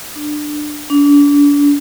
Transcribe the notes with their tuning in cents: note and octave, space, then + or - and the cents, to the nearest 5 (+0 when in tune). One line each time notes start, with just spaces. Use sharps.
D4 +20
D4 -35